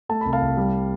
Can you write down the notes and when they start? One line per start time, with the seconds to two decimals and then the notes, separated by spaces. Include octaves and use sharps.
0.09 A3 A5
0.21 C2 B5
0.33 F5 A5
0.42 C2
0.57 G3